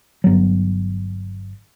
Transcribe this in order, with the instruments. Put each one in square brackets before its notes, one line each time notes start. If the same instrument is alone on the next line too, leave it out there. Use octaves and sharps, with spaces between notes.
[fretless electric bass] G1 F#3